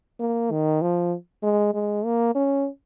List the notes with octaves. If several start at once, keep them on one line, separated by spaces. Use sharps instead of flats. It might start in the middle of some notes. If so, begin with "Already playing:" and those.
A#3
D#3
F3
G#3
G#3
A#3
C#4